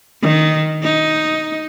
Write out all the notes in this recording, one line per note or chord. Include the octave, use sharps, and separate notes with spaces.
D#3
D#4